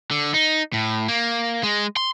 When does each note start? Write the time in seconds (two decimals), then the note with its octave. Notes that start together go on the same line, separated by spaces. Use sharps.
0.11 D3
0.34 D#4
0.73 A2
1.08 A#3
1.63 G#3
1.97 C6